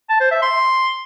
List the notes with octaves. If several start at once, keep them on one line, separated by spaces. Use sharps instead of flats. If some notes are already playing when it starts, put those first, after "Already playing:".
A5
C5
E5
C6